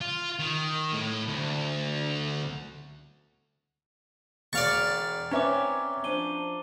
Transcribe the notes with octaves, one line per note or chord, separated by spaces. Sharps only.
F4
D#3
A2
D2
E1 D5 F5 C#6 A6
C4 C#4 B4 C#5 E5 A#5 D6
F3 D4 D#7 G7